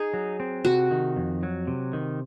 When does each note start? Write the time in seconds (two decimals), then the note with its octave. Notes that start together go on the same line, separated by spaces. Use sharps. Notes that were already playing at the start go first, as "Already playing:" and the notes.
Already playing: D#4 G#4
0.14 F#3
0.40 C4
0.65 C3 F#4
0.91 D#3
1.16 F2
1.43 F#3
1.67 C3
1.93 D#3